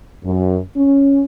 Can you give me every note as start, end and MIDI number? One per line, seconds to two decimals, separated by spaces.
0.24 0.58 42
0.76 1.23 61